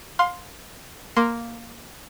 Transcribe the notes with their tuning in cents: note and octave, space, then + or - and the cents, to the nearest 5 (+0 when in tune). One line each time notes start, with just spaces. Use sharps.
F5 +25 C6 +0
A#3 +0 C6 +0